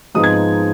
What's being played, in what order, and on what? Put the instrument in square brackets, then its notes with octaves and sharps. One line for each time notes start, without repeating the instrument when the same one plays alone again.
[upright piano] G#2 F3 G#3 B3 D#4 D#6
G#6